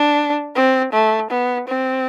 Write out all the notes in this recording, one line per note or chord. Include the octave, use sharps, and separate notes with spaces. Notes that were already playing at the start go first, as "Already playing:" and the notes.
Already playing: D4
C4
A3
B3
C4